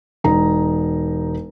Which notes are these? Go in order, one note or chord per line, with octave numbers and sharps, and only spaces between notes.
E1 D#4 A#5